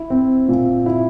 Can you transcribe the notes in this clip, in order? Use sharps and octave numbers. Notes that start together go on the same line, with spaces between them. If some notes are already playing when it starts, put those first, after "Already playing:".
Already playing: E4
C4
A#2
E4